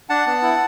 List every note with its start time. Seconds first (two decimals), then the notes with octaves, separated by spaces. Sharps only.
0.09 D4 F#5 A5
0.27 B3
0.42 E4